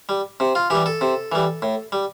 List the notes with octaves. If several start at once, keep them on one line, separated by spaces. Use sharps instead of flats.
G3
C3
F4
E3 G3 G4
A4
C3
E3 G3
A2
G3